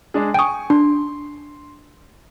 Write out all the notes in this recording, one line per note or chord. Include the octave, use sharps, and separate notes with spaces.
G#3 D4 G#4
G5 G#5 C#6 D#6
D4 C6